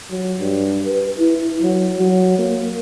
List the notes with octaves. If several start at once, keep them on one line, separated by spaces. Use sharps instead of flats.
F#3
G2
B4
E4
F#3
F#3
A#3